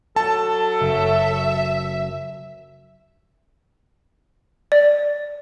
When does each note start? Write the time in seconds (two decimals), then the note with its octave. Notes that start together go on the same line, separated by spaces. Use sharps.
0.16 F#3 A4 A5
0.81 F#1 E5
4.72 D5